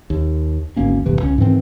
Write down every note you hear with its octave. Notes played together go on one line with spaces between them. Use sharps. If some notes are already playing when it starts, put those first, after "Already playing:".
D#2
G#1 D2 A#3 C#4
G1 E2 C3 E3
C#2 C#4
G#2 D#3 E3 C4